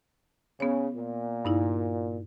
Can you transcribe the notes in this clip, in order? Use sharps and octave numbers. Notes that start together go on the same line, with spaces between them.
C#3 B3 C#5
A#2
G2 D#4 E4